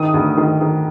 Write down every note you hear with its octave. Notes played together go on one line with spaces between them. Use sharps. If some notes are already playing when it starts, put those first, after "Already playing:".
Already playing: D#3 D#4 D#6
D2
D#3
D#3